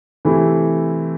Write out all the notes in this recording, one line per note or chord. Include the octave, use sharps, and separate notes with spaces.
C3 E3 A3 E4